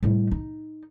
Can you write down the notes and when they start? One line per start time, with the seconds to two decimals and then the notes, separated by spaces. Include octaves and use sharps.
0.03 A2 G3
0.31 D#4